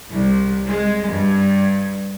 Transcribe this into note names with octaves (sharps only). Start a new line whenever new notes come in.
C2
G#3
G2